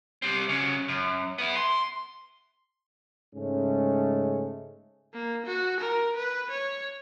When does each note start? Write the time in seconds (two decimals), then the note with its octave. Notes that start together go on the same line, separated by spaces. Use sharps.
0.22 G3 C4
0.49 C#3 F#3
0.88 F#2
1.38 B3 E4
1.57 C6
3.35 G#2 C#3 G#3 A3 C#4
5.13 A#3
5.46 F#4
5.80 A#4
6.16 B4
6.50 C#5